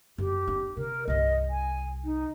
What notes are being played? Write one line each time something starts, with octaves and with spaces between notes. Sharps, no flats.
F#2 G4
C4 D4
C3 A#4
C2 G2 D#5
G#5
D#4